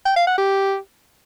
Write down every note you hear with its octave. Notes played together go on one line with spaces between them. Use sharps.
G5
F5
F#5
G4